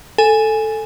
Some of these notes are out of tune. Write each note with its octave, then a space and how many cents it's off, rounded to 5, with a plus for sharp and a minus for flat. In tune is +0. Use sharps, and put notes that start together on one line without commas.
A4 +0 G#5 +0